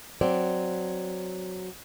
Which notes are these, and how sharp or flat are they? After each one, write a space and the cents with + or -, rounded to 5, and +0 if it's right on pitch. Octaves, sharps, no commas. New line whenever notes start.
F#3 +0 C4 +0 D5 -5